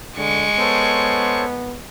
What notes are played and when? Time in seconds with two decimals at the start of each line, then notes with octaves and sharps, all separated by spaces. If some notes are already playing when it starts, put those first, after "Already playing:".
0.17 D3 G#3 C#6
0.59 B3 A4 C5 C#5